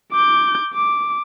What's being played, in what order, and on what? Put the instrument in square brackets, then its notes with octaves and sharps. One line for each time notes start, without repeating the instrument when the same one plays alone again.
[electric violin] D6 G6
D6